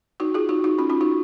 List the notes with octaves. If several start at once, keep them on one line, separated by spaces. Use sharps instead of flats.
D#4 F#4
F4 G#4
D#4 F#4
D#4 F#4
C#4 F4
C#4 F4
D#4 F#4